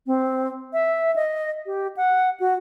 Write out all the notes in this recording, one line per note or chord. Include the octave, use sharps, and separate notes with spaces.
C4
E5
D#5
G4
F#5
F#4